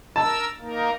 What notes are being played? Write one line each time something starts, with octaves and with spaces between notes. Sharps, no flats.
A#4 A5 E6
A#3 D#4 A#4